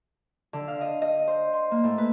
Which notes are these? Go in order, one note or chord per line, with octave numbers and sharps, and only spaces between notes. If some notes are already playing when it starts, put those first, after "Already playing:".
D3
F5
D#5
D#5
C5
C6
A#3
A2
B4